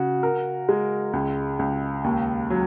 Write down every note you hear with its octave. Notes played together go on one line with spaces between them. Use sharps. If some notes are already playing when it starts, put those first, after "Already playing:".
Already playing: C#3 F#4
A#4
G#3
C#2
C#2
D#2
F#3